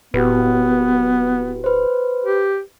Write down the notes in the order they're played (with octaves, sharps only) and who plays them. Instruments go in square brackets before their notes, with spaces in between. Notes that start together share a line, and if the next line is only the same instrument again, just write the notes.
[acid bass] D1 [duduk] B3 [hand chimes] F#4 G4 B4
[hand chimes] B4 C5
[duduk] G4